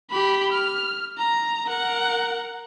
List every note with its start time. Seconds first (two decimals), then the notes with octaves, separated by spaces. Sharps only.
0.11 G4 B5
0.52 F6
1.18 A#5
1.68 A#4 F#5